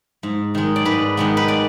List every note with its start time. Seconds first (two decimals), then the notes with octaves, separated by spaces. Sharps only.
0.23 G#2
0.55 D#3 G#3
0.76 D5
0.85 G#2 B4
1.17 D#3 G#3 B3
1.37 B4
1.48 D5